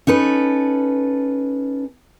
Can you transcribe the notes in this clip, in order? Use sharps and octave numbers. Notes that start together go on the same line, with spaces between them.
C#4 D#4 A4 B4